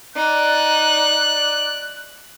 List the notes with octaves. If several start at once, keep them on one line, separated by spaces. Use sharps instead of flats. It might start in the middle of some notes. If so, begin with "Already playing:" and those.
D#4 D5 F#6